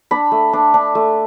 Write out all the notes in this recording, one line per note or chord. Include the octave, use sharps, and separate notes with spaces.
D4 B5
A3
D4
D4
A3